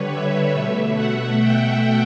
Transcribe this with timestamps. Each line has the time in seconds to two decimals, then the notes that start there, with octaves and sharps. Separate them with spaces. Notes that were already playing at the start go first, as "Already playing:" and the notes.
Already playing: D3 G3 B4 C#5
0.09 E5
0.53 B2 A3
0.95 F#5
1.39 G5